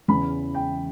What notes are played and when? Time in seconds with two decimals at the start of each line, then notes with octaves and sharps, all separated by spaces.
0.08 E2 C#3 E3 B5
0.55 G5